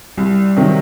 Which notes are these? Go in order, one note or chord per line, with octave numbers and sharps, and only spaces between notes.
C2 G3
C3 D#3 F#3